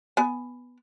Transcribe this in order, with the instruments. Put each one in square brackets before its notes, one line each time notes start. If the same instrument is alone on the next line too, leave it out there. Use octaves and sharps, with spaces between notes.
[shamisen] B3 G#5